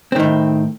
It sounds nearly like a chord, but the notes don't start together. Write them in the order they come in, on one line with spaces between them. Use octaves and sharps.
C4 D#3 A2